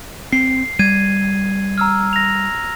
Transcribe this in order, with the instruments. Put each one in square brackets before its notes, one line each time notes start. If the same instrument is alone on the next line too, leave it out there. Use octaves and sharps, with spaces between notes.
[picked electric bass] C4 [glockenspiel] C7
[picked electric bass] G3 [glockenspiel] G#6 D#7
[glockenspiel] A#5 E6 F6
A#6 F7